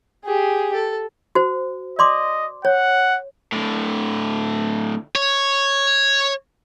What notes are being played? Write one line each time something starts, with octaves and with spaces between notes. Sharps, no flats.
G4 G#4
A4
F#4 C5
D5 D#5 C6 D6
C#5 F#5
A2 D3
C#5